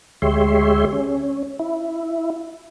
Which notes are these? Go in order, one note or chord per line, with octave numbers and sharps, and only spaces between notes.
D2 G#3 G4 C#5 E5 C6
C#4
E4